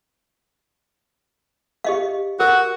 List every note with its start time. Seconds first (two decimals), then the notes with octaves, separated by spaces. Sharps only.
1.84 G4 D#5 F5
2.40 F#4 A#4